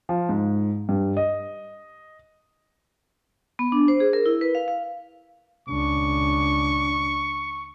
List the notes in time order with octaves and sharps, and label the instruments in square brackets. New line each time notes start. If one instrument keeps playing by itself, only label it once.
[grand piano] F3
G#2
G2
D#5
[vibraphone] B3
D4
C5
G#4
A#4
E4
B4
F5
F5
[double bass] C#2 D4 [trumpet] C#6